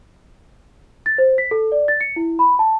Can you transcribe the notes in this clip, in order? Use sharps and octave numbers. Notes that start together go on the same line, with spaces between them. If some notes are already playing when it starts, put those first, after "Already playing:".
A6
C5
B6
A4
D5
A6
C#7
E4
B5
A5